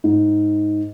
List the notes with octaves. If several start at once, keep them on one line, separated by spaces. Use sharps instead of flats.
G#2